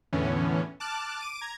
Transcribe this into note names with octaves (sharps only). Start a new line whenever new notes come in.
E2 A2 D3 E3 B3 C#4
A5 D6 F6 F#6
D6 D7 D#7
A#5 G#6